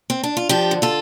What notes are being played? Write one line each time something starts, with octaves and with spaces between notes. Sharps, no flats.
C4
D4
F4
F3 D4 G4
D3
F4 A4